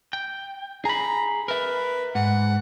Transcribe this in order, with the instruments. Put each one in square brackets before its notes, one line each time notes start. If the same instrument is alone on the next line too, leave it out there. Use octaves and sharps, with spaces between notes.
[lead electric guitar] G5
[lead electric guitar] G#4 B5 [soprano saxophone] A#5
[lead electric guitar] A#4 E5 [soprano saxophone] B4
[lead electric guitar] G#2 [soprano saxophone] F#5